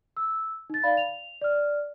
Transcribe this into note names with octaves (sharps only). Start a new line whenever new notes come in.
E6
D#4 A6
D5 F5 B5
F7
D5 F6